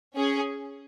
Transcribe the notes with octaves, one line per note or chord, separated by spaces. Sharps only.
C#4 G#4